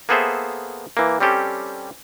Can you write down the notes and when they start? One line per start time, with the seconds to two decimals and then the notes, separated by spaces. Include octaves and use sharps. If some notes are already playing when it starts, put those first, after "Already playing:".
0.09 A#3 B3 G#4 A4 C5 E5
0.97 E3 A#3
1.20 G3 C4 C#4 G4 A4